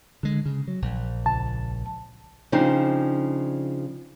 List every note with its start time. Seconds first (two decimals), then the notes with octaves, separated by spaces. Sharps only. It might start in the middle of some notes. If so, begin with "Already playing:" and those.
0.23 D3 G#3
0.46 C#3
0.68 F#3
0.82 A#1
1.26 C#2 A5
2.52 C#3 F3 C4 D4 D#4